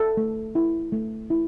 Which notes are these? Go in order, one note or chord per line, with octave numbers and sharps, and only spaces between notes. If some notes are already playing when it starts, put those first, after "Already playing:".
Already playing: A4
A3
E4
A3
E4